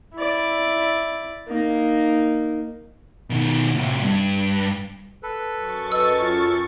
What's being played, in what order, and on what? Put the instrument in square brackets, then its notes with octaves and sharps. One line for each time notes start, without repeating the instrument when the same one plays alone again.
[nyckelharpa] E4 D5
A#3 D#4
[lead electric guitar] B2 D#3
A2 C3
G2
[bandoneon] A4 B4
[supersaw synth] F#2 C#6 A6
[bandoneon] A4 [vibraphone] B4 D#5 [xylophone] E6
[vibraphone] F4